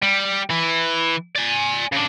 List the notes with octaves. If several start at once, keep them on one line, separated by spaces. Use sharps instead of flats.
G3
E3
D5 G#5
C#3 D4